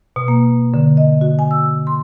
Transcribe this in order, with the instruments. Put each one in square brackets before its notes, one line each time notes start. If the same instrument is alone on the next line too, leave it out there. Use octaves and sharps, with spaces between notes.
[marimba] B2
A#3
D3
D#5
F#4
G#5
E6
C6